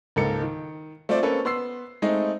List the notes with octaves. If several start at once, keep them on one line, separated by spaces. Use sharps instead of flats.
C#2 G#2 A#3 A4 A#4 C#7
D#3
A3 C4 F4 C5 D5
A#3 C4 C#4 A4 B4
B3 C6 E6 C7
G#3 A3 C4 D#4